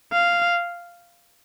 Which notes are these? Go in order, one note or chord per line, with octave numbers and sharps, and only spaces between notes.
F5